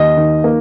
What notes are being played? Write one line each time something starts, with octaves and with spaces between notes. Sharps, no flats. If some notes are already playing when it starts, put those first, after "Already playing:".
Already playing: D#2 D#5
D#3
A#3